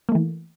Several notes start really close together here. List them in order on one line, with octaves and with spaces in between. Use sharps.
A#3 A3 E3